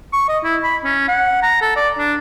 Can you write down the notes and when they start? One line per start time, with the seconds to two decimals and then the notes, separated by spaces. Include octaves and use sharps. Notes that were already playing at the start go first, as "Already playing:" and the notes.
0.13 C#6
0.28 D#5
0.44 E4
0.64 B5
0.84 C#4
1.08 F#5
1.42 A#5
1.61 A4
1.76 D5
1.98 D4